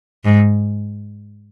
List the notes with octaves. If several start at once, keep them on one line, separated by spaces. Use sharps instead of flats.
G#2